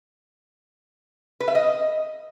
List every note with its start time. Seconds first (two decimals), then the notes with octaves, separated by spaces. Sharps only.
1.40 B4
1.48 E5
1.55 D#5